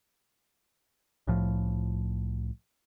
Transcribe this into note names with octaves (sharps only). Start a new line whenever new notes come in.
C2 A2 F3